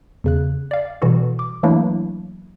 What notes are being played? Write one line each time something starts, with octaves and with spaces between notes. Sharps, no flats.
E2 C#3 F#6
D5 F5
B2 E3 G3 F#4 A4
D6
E3 F#3 A3 A#3 D4 E4